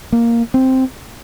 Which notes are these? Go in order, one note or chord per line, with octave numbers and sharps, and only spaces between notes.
A#3
C4